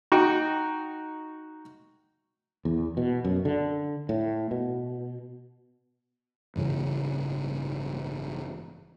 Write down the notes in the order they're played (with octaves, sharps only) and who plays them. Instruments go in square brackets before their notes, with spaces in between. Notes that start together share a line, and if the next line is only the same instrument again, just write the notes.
[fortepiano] D#4 F#4 G5
[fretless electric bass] E2
B2
F#2
D3
A2
B2
[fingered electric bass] A1 G2 C#3 E3